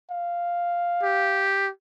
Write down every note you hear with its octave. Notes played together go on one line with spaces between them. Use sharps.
F5
G4